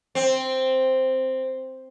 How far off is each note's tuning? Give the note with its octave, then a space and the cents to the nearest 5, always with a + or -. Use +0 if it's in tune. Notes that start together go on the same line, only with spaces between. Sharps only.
C4 +0